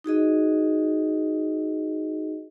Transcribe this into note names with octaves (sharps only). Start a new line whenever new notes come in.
D#4 F#4 G#4 D#5